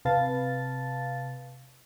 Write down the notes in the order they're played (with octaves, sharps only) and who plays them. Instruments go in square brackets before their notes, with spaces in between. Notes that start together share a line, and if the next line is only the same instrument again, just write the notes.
[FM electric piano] C3 B4 F5 A5 A6